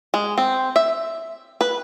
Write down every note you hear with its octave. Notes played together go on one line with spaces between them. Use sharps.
G#3
C4
E5
B4